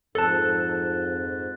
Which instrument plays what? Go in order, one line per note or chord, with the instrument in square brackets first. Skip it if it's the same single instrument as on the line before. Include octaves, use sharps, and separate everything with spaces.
[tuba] F2 [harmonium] G#2 [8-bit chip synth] A4 A5 [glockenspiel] F#6 A6